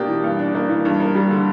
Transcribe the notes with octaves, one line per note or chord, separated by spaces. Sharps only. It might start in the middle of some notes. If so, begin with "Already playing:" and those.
Already playing: B2 A#3 D4 G4
E3
G2
D4
A#3
E3
G2
A#3
G3
D3